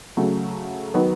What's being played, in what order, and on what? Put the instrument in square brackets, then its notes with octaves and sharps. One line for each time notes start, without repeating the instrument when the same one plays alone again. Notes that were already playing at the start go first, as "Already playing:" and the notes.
[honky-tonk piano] C#3 F#3 A3
D#3 F#3 B3